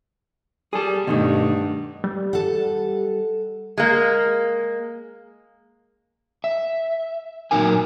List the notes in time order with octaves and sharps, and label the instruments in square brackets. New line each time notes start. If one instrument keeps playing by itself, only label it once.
[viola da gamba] G3 [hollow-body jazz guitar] G#4 A4
[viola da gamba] G2 [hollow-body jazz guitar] B2 D#3 A3
[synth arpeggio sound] G3
[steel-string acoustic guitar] A4 F#5
[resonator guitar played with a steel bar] G#3 A#3
[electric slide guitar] E5
A#2 E3 F#3 D#4 A#4 G#5